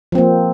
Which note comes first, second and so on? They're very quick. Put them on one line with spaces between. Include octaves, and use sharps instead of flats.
F3 C4 A#3